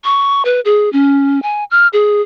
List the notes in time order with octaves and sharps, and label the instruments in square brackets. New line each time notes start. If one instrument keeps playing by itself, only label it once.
[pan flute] C#6
B4
G#4
C#4
G#5
F6
G#4